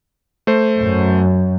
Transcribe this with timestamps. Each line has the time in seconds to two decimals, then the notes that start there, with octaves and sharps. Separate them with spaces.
0.47 A3 C5
0.78 F#2